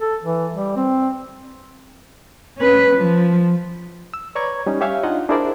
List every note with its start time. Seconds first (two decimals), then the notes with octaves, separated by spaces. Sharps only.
0.01 A4
0.24 E3
0.55 G3
0.76 C4
2.57 C#4 B4
2.95 F3
4.14 E6
4.35 B4 C#5 D5 A#5 C#6 G#6
4.66 G3 C#4 D#4
4.81 G4 C#5 E5 F5 G#5
5.03 D4 D#4 F4 D#5 F#5
5.29 D4 E4 G#4 A#4 C5 D5